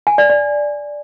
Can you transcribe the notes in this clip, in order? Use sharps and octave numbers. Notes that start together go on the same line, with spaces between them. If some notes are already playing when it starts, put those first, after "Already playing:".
G#5
D5
D5